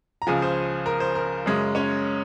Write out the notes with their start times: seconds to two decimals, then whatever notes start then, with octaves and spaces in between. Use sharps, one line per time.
0.22 A#5
0.27 C#2 C#3 F3 G#4 G#5
0.42 C5
0.86 A#4
1.00 C5
1.15 A#4
1.46 F#2 C#3 G#3 C#4
1.75 C#4 C#5